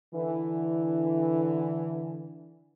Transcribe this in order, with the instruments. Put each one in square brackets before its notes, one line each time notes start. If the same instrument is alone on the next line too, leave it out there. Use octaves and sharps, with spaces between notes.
[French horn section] D3 E3